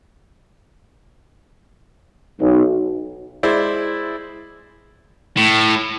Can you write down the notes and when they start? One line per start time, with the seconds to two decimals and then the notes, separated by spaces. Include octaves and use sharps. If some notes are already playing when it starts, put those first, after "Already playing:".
2.40 B1
3.43 G#3 E4 C5 D5
5.37 A2